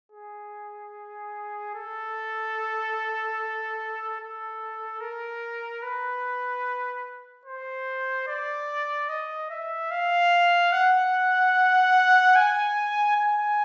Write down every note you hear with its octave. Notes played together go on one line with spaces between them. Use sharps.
G#4
A4
A4
A#4
B4
C5
D5
D#5
E5
F5
F#5
G#5
G#5